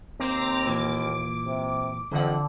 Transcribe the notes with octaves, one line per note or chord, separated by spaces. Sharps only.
D#2 C4 A#5 D6
A#2 E3 D6
C3
F2 D3 E3 F#5